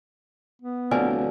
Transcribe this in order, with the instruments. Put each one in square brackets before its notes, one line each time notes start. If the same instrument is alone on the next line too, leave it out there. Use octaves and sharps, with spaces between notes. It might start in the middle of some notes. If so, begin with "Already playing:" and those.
[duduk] B3
[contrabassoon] D1 [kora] D3 F3 F#3 [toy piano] B4 D5 G#5